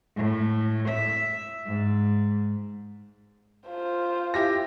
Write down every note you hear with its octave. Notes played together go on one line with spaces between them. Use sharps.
A2
E5
G#2
F4 C5
E4 G4 A#6